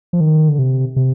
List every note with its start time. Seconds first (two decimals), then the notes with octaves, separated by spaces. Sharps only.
0.13 F3
0.20 D#3
0.49 D3
0.59 C3
0.96 C3